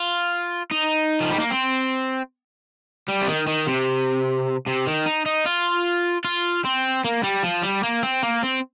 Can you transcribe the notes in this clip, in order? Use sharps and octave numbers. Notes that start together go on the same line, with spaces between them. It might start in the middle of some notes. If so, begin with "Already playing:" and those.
Already playing: F4
D#4
F3
G3
A#3
C4
G3
C3
D#3
D#3
C3
C3
D#3
D#4
D#4
F4
F4
C4
A#3
G3
F3
G3
A#3
C4
A#3
C4